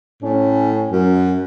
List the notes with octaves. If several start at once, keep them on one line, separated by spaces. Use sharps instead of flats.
A2 C#4
F#2